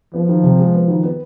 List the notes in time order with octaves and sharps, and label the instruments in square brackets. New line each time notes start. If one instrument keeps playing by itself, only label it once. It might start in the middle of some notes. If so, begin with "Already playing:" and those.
[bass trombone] F3 [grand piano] B3
[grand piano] D#3
C3
G#3
B3
D#3
B3